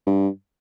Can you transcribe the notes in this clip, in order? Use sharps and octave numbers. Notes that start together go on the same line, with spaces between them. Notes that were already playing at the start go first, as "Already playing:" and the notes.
G2